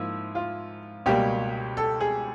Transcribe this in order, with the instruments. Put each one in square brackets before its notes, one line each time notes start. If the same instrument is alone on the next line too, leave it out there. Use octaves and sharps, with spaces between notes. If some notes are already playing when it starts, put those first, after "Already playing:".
Already playing: [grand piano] G#2 F3 A#3 E4
F4
C#2 B2 G3 A#3 G4
A4
G#4